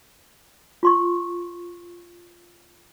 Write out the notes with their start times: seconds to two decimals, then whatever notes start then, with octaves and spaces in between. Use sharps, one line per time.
0.83 F4 C6 C#6